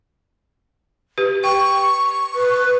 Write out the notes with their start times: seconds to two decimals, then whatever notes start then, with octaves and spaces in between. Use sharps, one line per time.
1.18 G4 B4
1.44 G5 C#6
2.36 B4